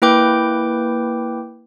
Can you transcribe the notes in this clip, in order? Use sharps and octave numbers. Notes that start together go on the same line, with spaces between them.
A#3 E4 B4 G5 D6 G6